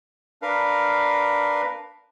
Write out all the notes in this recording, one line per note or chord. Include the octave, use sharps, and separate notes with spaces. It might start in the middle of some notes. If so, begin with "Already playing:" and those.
D4 A#4 B4 F5